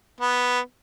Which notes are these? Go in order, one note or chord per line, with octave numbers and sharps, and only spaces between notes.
B3